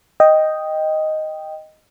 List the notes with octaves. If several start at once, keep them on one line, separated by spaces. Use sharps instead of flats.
D#5 G5